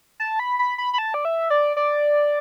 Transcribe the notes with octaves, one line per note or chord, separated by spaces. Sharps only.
A5
B5
B5
B5
B5
A5
D5
E5
D5
D5